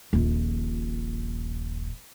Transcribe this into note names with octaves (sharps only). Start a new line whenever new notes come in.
D#1 A#1